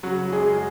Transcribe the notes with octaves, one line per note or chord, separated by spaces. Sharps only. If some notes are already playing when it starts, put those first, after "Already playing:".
C#3 F#3 F#4
F#2 G#3 G#4